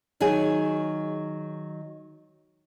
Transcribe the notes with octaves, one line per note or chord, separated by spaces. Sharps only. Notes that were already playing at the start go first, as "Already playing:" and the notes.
D#3 F#3 F#4 G#4